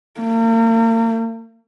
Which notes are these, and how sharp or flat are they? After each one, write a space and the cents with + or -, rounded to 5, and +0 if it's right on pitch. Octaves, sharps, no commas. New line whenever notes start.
A#3 -40